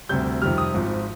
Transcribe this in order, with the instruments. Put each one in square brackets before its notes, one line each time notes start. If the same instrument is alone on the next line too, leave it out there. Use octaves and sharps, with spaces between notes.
[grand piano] D2 C3 G3 G6
F2 C3 D#3 G3 F6
D#6
G#1 G#2 F3